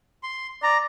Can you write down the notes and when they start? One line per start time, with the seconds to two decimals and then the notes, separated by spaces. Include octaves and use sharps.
0.23 C6
0.63 D5 A#5